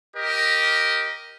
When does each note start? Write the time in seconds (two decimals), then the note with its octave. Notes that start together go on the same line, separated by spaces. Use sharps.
0.15 G4 A#4 D#5